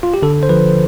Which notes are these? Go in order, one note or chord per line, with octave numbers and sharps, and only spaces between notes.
F4
G4
D3 A4
C5
F3 B4